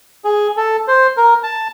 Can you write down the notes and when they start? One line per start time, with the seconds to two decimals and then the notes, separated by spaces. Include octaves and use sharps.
0.25 G#4
0.57 A4
0.88 C5
1.17 A#4
1.43 A5